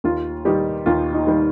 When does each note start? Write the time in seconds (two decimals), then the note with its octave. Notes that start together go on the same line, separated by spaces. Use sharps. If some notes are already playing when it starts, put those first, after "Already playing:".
0.04 D#2 F4
0.45 D#3 G3 D#4 G4
0.86 D#2 F4
1.14 D#4
1.27 D#3 G3